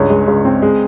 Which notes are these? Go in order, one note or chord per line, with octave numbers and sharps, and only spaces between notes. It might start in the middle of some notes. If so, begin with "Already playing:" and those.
Already playing: C#2 G2 C#5
G#3
C#2
C4
G#3